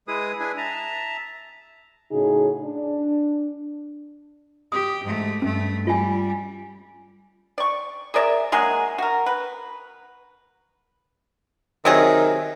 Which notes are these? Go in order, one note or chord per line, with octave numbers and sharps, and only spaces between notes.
G#3 E4 G#4 B4 D#6
D4 E4 G#4 B4 G#5
E5 A5 A#5
A2 C#3 D#4 F#4 G#4
D4
G4 D#6
G#2 A3
G2 A3 C#4
G3 F4 G#5
D5 C#6
G#4 A#4 D5 E5
F#3 G#3 A#3 G#4
F#4 A#4
B4
C3 D#3 F#3 G#4